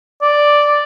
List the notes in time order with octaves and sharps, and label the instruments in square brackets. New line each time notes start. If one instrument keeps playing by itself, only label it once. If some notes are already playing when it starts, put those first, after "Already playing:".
[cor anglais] D5